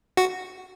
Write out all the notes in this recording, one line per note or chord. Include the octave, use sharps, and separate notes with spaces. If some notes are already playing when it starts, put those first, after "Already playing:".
F#4